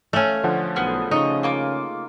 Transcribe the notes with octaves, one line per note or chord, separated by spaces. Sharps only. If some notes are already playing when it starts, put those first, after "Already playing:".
A3 C#4 F5
D3 F3 F#5
B1 B3 G#4 F6
C#3 D#4 D#5 C#6
A#3 F4 D6